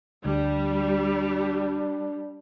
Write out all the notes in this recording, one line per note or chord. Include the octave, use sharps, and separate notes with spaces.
D2 G3 D4